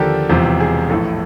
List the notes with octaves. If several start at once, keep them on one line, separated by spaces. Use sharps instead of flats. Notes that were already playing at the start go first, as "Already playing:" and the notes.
Already playing: D#2 D3 F3 G4 A4 A#4
E1 E2 C3 F3 G4
G#4
A#1 A2 E3 A4